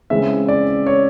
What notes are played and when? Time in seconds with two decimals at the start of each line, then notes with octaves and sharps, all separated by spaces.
0.10 C#3 E3 G#3 C4 E5
0.48 D5
0.87 C#5